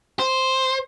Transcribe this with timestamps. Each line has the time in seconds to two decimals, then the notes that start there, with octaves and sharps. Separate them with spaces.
0.19 C5